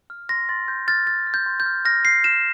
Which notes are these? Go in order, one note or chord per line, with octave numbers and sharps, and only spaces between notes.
F6
C6 A#6
C6 A6
C6 G6
F6 A6
F6 A6
F6
G6
C6
G6
F6
F6 A#6
F6 C7
F6 E7